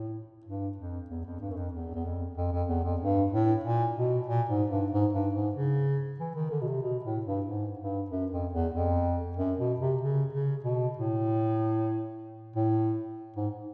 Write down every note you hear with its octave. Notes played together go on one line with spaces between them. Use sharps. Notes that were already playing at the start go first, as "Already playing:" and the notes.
Already playing: A2
G2
F2
E2
F2
G2
F#2
F2
E2
E2
F2
F2
F2
E2
F2
G2
A2
A#2
B2
A#2
G#2
G2
G#2
G2
G#2
C#3
E3
D#3
D3
B2
C3
B2
A2
G2
G#2
G2
F#2
F2
E2
F2
F#2
B2
C3
C#3
C#3
B2
A2
A2
G#2